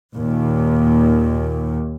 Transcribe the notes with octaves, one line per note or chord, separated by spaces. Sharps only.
D#2 A#2